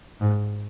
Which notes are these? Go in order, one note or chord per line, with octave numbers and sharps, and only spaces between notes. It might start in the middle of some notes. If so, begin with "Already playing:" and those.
G#2